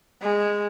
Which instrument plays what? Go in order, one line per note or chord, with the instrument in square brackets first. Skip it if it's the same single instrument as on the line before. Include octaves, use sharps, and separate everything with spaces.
[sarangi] G#3